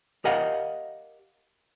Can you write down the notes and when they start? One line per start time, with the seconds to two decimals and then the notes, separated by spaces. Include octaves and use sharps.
0.25 G4 A#4 D#5 F5 F#5